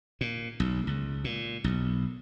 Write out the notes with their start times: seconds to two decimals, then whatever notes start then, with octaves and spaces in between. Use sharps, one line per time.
0.21 A#2
0.60 B1
0.87 C#2
1.24 A#2
1.64 B1